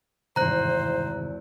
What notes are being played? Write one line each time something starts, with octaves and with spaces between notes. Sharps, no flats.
G#1 E2 G2 C3 D#3 C5 A#5 F#6